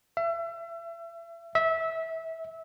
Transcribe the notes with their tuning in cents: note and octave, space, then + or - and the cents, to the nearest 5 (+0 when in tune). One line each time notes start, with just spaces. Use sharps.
E5 +35
E5 -20